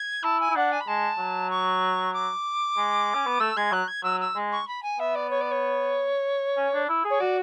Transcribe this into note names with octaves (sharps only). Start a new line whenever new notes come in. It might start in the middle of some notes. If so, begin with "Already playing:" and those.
Already playing: G#6
E4 A5
G#5
E4
D4 F#5
G#5
B5
G#3 A5
F#3
C#6
D6
G#3
C#4
B3
A3 E6
G#3 G#6
F#3 F#6
G#6
F#3 E6
E6
G#3
C#6
B5
G#5
B3 E5
D5
C#5
D5
C#5
C#4
D4
E4
G#4
C#5
F#4 D5